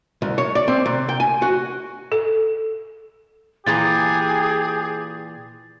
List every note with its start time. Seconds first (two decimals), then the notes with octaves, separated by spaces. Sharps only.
0.22 C2
0.38 C#5
0.55 D5
0.68 C4
0.86 C3
1.09 G5
1.20 G#5
1.42 F#4
2.12 A4
3.66 A#2 E3 G4 G#4 A#5 A6